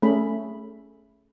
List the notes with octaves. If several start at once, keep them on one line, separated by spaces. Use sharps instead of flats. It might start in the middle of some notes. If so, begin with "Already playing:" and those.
A3 C#4 G#4 B5